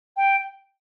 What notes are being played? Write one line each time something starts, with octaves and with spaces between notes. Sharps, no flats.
G5